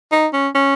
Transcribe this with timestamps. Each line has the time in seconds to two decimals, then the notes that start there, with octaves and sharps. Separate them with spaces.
0.12 D#4
0.33 C#4
0.55 C#4